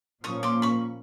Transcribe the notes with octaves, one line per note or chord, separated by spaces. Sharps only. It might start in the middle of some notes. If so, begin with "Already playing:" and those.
A#2 F3 A#3 C#4 C#6 D#6
C6 D6
B5 C#6